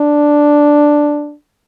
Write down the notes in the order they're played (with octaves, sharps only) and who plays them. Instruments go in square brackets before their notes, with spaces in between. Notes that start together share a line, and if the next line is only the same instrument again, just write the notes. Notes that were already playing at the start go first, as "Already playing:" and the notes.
Already playing: [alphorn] D4